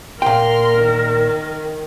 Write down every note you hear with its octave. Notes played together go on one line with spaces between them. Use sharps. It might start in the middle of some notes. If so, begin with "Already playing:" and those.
A#2 A#4 G5 C6 F6
D#3